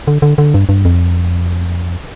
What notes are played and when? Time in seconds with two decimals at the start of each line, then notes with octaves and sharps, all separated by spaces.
0.07 D3
0.22 D3
0.38 D3
0.54 G2
0.69 G2
0.85 F2